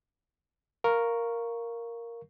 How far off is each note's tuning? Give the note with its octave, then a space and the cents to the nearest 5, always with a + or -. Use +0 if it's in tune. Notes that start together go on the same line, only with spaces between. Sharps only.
A#4 +0 F5 +0 C#6 +0